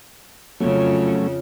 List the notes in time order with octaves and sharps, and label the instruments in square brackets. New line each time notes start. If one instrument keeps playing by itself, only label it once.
[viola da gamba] F2 C#3 F4 [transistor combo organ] F#3 A3 C#4